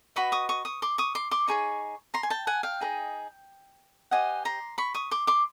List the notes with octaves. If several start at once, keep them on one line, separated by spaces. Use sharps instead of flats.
F#4 B4 D#5 B5 C#6
C#6 D#6
C#6 D#6
C#6 D#6
C6 D6
C#6 D#6
C6 D6
C6 D6
D#4 G#4 C#5 C#6
A#5 C6
G#5
G5 A5
F#5 G#5
F5 G5
D#4 G#4 B4 D#5
G4 C5 D#5 F#5 G#5
A#5 C6
B5 C#6
C#6 D#6
C6 D6
C6 D6